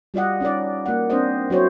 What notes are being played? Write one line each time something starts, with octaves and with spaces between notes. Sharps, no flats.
G3 F4 D5 D#5 F#5
C#4 D#4 B4 D5
A#3 F#5
C4 D4 C5 D#5
F#3 E4 C5 C#5